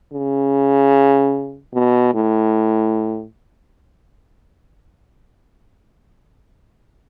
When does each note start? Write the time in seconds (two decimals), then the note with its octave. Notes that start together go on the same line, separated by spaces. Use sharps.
0.13 C#3
1.74 B2
2.15 A2